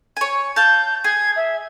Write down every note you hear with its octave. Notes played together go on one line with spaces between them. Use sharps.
C#5 G#5
F5 A5 G6
G#4 G#6
E5